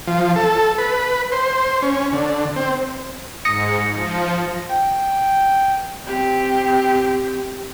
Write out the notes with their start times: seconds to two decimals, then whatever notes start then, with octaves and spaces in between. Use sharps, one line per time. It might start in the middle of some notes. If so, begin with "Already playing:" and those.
0.07 F3
0.36 A4
0.78 B4
1.32 C5
1.82 C#4
2.12 D3
2.56 C4
3.45 G#2 D#6 A#6 C#7
3.89 F3
4.69 G5
6.05 C4 G4